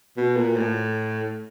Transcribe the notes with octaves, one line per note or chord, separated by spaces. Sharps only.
B2
A#2
A2